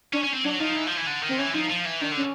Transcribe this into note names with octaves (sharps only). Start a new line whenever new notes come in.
C#4 D4
C#4
C4
F#3 D4
F3 D#4
E3
F3
E3
D3
D#3
C4
E3 C#4
F3 D#4
F3
E3
D#3 D4
D3
C#4